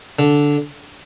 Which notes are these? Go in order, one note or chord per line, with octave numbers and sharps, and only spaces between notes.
D3